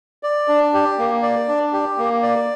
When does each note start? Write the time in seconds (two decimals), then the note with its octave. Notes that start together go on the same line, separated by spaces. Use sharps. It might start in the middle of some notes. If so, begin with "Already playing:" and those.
0.23 D5
0.48 D4
0.74 G4
0.98 A#3
1.23 D5
1.48 D4
1.73 G4
1.98 A#3
2.23 D5